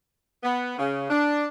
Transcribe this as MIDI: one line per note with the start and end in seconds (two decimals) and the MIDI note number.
0.43 0.76 59
0.78 1.07 49
1.10 1.45 62